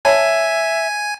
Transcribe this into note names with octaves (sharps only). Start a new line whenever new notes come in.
C#5 E5 G#5 A5 B5